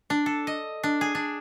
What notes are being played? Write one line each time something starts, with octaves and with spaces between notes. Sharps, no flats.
D4
A4
D#5
D4
G#4
D4